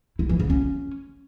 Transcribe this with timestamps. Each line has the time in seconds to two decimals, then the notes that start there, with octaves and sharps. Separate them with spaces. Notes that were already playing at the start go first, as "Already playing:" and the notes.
0.19 E4
0.29 E3
0.40 C#3
0.50 C#4